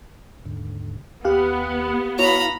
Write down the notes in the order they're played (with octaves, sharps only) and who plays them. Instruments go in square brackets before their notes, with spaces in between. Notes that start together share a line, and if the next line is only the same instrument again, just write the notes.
[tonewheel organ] D#2 G#2 D3
[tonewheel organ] D#2 F#6 [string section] B3 [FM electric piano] G4 F5
[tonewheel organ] E4 F5 [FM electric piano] F#4 C#5 [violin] A#5 B5